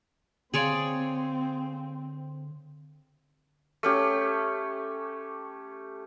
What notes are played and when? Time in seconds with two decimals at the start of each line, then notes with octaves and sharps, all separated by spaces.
0.54 D3 C4 G#4 C#5 D5 F5 C6 D#7
3.83 A3 C#4 G4